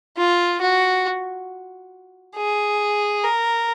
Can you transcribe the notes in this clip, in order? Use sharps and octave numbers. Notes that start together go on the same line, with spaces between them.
F4
F#4
G#4
A#4